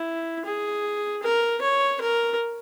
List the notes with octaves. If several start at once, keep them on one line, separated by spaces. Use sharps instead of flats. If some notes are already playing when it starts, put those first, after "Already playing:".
Already playing: E4
G#4
A#4
C#5
A#4